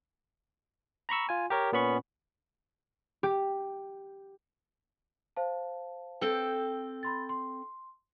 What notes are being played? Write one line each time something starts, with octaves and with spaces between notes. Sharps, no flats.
A#5 B5 C#6 E6
F4 G#5
G4 A#4 C#5
A#2 B3 C#4 B5 C#6
G4
C5 F5 A5
C4 A4 G5
B5 C6 A6
C6